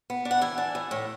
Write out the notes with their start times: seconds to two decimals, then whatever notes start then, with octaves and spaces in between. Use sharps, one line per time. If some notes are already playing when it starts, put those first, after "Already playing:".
0.10 B3
0.25 D4
0.31 F#5
0.41 E3 G#5
0.58 D4
0.75 E3
0.91 A2